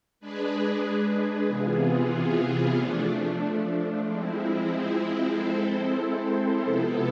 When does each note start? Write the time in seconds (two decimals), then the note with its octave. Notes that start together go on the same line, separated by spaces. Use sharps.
0.20 G#3 D4 G#4 B4
1.47 C3 E3 B3 F4 G#4
2.76 F3 A3 D4
4.04 F3 G#3 C4 E4
5.32 G#3 C4 E4 A4 C5
6.60 C3 F3 B3 E4 A4